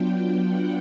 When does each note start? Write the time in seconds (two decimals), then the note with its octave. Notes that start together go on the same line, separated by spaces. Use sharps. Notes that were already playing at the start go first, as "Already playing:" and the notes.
Already playing: F#3 B3 D4 F4 G5
0.48 F#5